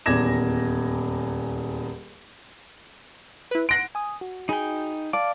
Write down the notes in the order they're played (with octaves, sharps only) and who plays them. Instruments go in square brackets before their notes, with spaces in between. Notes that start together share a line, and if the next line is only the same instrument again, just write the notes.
[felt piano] D#1 E2 D6 G#6 A#6 E7
[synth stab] E4 B4
[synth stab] F#5 C6 [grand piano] A#6 D7
[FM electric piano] G#5 D#6
F#4
[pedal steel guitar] D#4 G5 [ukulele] G#4 B5
[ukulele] D5 [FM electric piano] F5 A5 [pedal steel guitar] D6